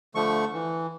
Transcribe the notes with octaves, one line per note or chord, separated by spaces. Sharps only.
D3 F3 A3 C#6
E3